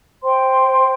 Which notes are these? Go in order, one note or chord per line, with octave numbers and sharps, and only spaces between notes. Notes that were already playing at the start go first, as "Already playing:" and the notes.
C5 G5 C6